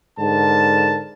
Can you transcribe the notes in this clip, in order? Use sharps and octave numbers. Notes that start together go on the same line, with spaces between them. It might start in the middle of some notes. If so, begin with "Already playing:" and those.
G#2 D3 A#4 A5